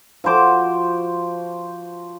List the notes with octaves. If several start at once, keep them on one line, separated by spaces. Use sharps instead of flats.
F3 F#4 C5 D6